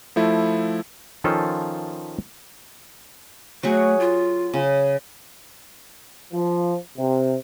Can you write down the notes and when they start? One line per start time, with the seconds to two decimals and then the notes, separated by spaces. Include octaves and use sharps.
0.16 F3 A3 E4
1.24 D#3 F3 C#4 F4 A4
3.63 F#3 A3 F#4 G#4
4.00 F4
4.54 C#3
6.32 F3
6.96 C3